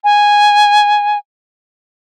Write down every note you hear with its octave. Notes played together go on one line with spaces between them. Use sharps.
G#5